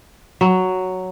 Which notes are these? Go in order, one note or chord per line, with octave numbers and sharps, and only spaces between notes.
F#3